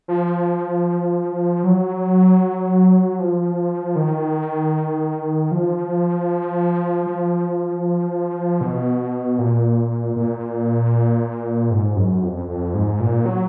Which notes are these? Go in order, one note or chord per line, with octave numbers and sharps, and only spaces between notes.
F3
F#3
F3
D#3
F3
F3
B2
A#2
A#2
G#2
F#2
F2
F2
G#2
A#2
F#3